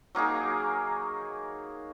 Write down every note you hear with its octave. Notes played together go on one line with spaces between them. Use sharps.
F#3 A#3 D#4 G#4